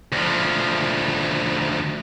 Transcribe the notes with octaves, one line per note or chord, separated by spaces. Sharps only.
D2 F3